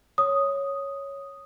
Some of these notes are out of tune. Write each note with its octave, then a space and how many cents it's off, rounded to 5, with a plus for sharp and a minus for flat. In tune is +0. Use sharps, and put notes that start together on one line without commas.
C#5 +0 D#6 +0